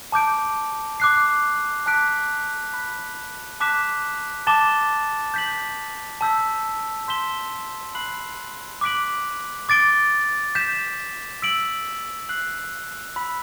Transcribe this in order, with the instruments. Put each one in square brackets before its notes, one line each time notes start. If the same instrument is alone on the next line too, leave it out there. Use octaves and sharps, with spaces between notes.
[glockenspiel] A5 D6 G6 D7
D6 F#6 C7
A5 D6 F#6 B6 D7
B5 F#6 B6
A5 D6 F#6 B6 E7
A5 D6 A6 E7 G7
G6 B6 F#7
A5 E6 G6 B6
C6 G6 B6 E7 G7
B5 F#6 C7 F#7
D6 F#6 B6 D7 F#7
D6 A6 D7 G7
G6 B6 E7
E6 B6 D7 F#7
F#6 C7 F#7
B5 E6 B6